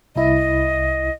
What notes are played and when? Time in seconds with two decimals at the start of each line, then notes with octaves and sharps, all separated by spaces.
0.16 C2 E4 D#5